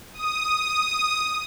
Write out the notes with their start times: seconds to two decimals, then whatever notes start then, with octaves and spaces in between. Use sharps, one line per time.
0.13 D#6